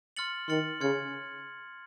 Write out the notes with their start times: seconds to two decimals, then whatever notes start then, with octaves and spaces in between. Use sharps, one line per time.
0.16 C6 F6 A6 C#7 F#7
0.48 D#3 C6 F6 A6 C#7 F#7
0.80 C#3 C6 F6 G#6 C#7